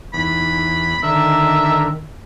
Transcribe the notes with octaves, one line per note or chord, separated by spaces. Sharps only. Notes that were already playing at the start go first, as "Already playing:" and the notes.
E2 D#4 B5
D3 D#3 A#4 E5